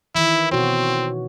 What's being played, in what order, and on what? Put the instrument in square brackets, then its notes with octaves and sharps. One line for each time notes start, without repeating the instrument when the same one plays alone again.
[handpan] D#3 E3 [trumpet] E4
[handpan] B2 F#4 C#5 [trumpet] C4